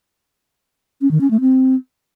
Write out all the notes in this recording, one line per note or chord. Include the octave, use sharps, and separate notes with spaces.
C#4
D#3
C#4
A3
C4